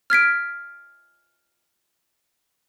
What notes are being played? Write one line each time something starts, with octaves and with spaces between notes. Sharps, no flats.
F6 G#6 B6 D7